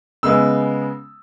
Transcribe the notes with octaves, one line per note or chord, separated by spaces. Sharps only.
C#3 G#3 B3 E6